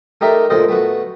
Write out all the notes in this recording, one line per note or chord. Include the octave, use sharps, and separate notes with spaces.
A3 D#4 G4 A#4 D5 E5
D2 A#2 D4 A4 C5 D#5
A3 B3 F#4